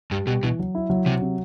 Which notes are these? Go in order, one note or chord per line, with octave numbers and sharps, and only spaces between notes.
G2 G3
B2 G3
B2 E3
F#3
E4
F#3
C3 F#3
C3